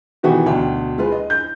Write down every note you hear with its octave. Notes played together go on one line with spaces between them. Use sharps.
B2 D#3 E3 B3 F#4 G4
D2 B2 D4 G5
G#3 F4 B4
D#5
G6